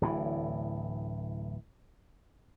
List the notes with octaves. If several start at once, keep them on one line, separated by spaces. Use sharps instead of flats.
D1 A2 E3